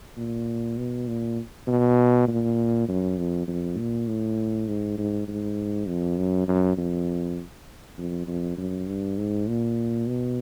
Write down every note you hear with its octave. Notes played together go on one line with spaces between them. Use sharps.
A#2
B2
A#2
B2
A#2
F#2
F2
F2
A#2
A2
G#2
G#2
G#2
F2
F#2
F#2
F2
F2
F2
F#2
G2
G#2
A#2
B2